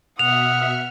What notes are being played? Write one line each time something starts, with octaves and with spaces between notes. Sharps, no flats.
B2 E5 F#5 D#6 F6 F7